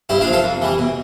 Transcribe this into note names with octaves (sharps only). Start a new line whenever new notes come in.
G2 E4 G4
D4 F4
F3
F4 A4
F2
E3 G3
B2